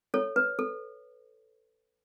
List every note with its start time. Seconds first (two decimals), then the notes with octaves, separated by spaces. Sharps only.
0.14 A4 C#5
0.36 B4
0.59 A4